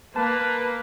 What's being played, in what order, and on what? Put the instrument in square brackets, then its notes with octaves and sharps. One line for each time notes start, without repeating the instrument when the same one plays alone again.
[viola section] A#3 [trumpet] B4 [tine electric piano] A5